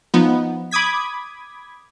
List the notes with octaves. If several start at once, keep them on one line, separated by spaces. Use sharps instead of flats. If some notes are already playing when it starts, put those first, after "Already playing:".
F3 B3 D#4
B5 D6 D#6 G#6 B6